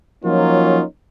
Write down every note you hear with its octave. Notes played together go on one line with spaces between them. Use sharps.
F3 F#3 A#3 C#4 D#4 F4